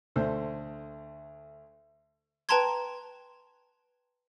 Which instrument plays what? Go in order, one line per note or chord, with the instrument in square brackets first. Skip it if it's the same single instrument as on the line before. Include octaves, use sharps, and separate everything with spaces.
[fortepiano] D2 A3 C5
[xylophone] B4 G5 A5 A#5 C6 G#6